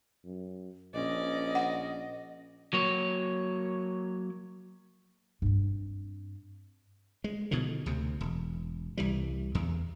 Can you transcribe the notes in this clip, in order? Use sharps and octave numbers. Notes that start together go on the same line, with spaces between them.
F#2
A#1 C#4 D5 D#5
F#5
F#3 A#3 C#5
G2 C4
G#3
B2 D3 D#3 F3
D2 C3
E1
C2 E3 G3
E2